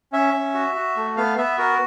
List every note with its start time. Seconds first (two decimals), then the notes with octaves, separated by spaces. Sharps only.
0.12 C#4 E5
0.34 C#4
0.54 F#4
0.75 F#4
0.96 A3
1.17 B3 F5
1.38 B3 E5
1.58 F#4 A#4